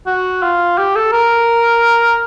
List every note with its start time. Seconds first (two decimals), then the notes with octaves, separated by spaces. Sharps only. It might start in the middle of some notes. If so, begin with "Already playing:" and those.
0.07 F#4
0.42 F4
0.78 G4
0.96 A4
1.12 A#4